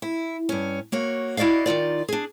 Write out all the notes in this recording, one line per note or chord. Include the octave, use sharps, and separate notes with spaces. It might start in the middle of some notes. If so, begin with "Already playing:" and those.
E4
G2 C#4
A#3 F#4 C#5
E4 F#4 D5 D#5 F5
D#3 D#4 F4 D5
D4 G#4